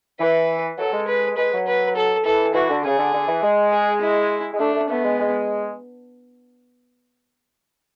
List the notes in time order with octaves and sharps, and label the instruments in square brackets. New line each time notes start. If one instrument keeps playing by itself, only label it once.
[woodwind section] E3 [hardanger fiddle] B4
[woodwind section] F#3 [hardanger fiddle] A4
[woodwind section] G#3
[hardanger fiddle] B4
[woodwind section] G#3 [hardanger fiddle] B4
[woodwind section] F#3
[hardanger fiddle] B4
A4
[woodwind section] E3 [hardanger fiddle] A4
[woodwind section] E3 [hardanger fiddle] F#4
[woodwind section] D3
[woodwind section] C#3 [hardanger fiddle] G#4
[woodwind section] D3
D3
E3
G#3
[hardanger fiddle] G#4
E4
[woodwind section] G#3
[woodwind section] A3 [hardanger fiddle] D4
[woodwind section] A3
[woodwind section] A3 [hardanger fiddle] B3
[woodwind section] G#3
G#3